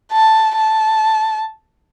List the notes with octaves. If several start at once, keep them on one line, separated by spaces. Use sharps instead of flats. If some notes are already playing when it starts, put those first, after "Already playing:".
A5
A5